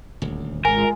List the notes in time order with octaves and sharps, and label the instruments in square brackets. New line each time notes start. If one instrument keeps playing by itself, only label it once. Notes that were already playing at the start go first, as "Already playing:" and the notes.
[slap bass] D#1 D2
[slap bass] G#1 C#3 [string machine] G#3 F4 [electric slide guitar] A#4 [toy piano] G#5